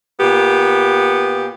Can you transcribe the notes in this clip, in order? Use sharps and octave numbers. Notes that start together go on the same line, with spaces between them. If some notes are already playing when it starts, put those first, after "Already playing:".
A#2 B3 G4